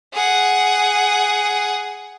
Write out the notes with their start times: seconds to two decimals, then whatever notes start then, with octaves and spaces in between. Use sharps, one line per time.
0.13 G#4 F#5